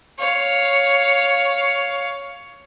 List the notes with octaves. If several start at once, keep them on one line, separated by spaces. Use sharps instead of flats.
C#5 F5